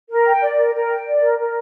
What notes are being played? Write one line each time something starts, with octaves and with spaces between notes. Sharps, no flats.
A#4
G5
D5
A#4
A#4
G5
D5
A#4
A#4